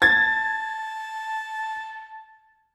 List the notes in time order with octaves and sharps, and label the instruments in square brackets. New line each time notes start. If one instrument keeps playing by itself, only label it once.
[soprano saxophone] A5 [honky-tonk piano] G#6 A6